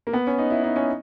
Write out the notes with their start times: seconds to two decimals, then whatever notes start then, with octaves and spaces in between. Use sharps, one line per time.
0.07 A#3
0.13 B3
0.27 C#4
0.38 D#4
0.50 E4
0.64 D#4
0.76 C#4